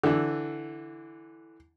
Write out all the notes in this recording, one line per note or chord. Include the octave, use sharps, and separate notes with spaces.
D3 E3